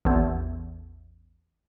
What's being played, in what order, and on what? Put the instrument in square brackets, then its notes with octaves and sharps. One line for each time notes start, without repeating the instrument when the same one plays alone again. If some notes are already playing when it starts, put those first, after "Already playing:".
[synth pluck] A1 E2